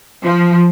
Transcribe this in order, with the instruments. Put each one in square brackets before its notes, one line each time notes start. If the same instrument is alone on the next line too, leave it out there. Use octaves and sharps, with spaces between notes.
[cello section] F3